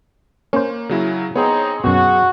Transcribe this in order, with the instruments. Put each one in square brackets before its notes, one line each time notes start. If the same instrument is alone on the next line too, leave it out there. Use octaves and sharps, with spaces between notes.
[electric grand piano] A#3 [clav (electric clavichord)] C#4 C5
[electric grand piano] C#3 F#3 E4
[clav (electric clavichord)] B3 [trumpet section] C4 D#4 [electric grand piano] G#4 C#5
[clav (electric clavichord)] F#2 B2 [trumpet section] F#4